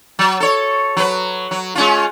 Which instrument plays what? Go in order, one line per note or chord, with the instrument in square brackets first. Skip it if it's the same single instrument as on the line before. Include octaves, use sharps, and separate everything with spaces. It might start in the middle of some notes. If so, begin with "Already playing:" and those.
[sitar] F#3
A4 C#5
F#3 B4
F#3
G#3 C#4 F4